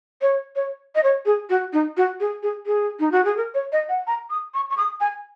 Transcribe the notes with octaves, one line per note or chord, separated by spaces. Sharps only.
C#5
C#5
D#5
C#5
G#4
F#4
D#4
F#4
G#4
G#4
G#4
D#4
F#4
G#4
A#4
C#5
D#5
F#5
A#5
D#6
C#6
C#6
D#6
G#5